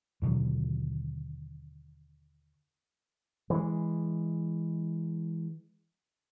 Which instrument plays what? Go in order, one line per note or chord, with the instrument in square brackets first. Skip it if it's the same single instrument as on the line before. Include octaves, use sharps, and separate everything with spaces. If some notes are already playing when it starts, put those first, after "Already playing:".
[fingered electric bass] D#2 B2 D3 F#3
[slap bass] E3 G#3